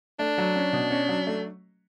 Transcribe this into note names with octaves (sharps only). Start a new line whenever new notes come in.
A3 D4
F#3
C#4
B2
C#4
F#3
A3